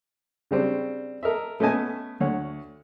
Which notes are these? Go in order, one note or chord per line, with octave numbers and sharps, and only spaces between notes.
C#3 G3 C4 D4
A4 A#4 D#5 E5
A3 B3 C#4 D#5 G#5 A5
D2 C#5 F#5